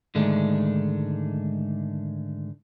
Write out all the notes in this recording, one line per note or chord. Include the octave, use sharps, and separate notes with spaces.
G#2 D3 D#3 G#3 A3 D4